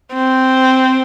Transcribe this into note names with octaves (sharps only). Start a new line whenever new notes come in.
C4